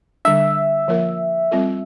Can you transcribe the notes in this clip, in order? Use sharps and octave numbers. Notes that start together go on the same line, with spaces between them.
D3 G3 D4 E5
F3 A#3 F4 A#4
G3 C4 F4 A4